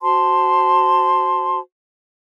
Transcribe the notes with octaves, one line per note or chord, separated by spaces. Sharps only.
F#4 C5 A5 C6